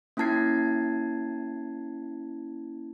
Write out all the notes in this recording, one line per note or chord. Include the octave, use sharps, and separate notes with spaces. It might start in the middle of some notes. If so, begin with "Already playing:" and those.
A#3 C#4 E4 A5 G#6 C7